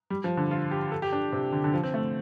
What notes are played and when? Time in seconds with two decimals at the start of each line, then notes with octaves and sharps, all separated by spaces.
0.10 G3
0.24 F3
0.37 D3
0.51 F4
0.71 G4
0.92 A4
1.02 G4
1.12 D4
1.32 C3
1.52 D3
1.64 D3
1.73 F3
1.83 C4
1.94 A3